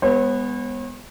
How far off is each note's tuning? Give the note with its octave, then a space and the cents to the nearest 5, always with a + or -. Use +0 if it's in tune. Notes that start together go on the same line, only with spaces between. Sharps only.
G#3 -35 B3 +0 C#5 -45